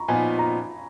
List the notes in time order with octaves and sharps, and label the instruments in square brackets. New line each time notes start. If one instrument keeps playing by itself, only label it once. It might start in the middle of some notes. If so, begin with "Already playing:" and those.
Already playing: [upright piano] A#5 B5 C#6
[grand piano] A#2 F3 B3 D#4 [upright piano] G#5
[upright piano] B5
A#5